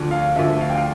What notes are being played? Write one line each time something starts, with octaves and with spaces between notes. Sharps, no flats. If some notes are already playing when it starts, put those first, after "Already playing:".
Already playing: D2 D3 F3
F5
D2 D3 F3 E5
F5
G5
F5